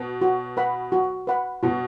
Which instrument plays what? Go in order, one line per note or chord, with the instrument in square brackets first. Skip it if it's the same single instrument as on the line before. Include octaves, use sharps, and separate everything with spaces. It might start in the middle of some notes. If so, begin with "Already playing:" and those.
Already playing: [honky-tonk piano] B2
[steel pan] F#4
B4 F#5 B5
F#4
B4 F#5 B5
[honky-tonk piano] B2 [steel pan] F#4